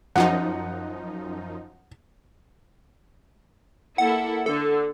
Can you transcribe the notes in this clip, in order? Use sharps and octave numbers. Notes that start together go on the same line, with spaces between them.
F#2 F3 D#4 F#5
A#3 E4 A4 F#5
D3 A4